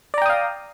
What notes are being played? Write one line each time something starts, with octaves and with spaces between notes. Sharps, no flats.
D5 F5 G5 A#5 D#6